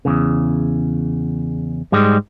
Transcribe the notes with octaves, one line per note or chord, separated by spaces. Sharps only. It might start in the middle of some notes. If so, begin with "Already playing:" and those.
E2 G#2 C#3
G#2 G3 G#3